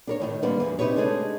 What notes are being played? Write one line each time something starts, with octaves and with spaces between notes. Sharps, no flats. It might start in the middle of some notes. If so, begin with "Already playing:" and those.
D4 A#4 C#5
A2 D#3 F4
D3 G3 A#3 B3 D4 B4
E2
C3 D#4 G4 B4 C#5
G#3 A3 D4 G#4 A4